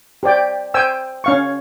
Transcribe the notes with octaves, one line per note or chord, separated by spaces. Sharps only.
G4 C5 D5 G5
C5 G5 G#5 E6
C#4 F5 C#6